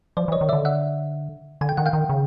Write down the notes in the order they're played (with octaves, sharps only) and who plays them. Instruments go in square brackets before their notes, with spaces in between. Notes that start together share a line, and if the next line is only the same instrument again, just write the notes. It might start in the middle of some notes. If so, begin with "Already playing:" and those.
[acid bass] F3 [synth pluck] C5 D5
[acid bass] E3
[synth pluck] C#5 D#5
[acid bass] D#3
[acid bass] D3 [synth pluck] D5 E5
[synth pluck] E5 F#5
[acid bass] D3 [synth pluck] G#5
[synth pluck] G5
[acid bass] D#3 [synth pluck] F#5
[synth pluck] F5 G5
[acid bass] D#3
C#3